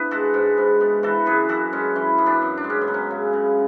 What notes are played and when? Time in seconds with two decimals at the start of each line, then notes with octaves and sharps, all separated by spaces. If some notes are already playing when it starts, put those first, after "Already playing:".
Already playing: B3 D4 E4 B4
0.11 G#3 F#4 A4
0.34 G#2
0.57 G#2
0.81 B3
1.03 E3 F#4 A4
1.26 F#2 G#4 B4
1.49 F#2 F#4 A4
1.73 G#3 C#4
1.96 E3 C#4
2.18 F#2
2.26 B3 D4
2.42 F#2
2.57 D4
2.64 G#3
2.70 C#4
2.81 B3
2.88 F#3
2.94 C#4
3.11 C#3
3.33 C#3